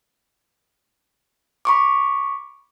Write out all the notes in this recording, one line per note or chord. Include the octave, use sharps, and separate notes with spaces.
B5 C#6 D6